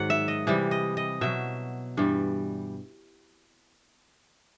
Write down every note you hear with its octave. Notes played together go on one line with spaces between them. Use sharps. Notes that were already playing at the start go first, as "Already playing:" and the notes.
Already playing: G#2 D#3 F#3 F#5
E5
D#5
C3 E3 G3
D#5
D#5
B2 F#3 E5
G2 E3 G3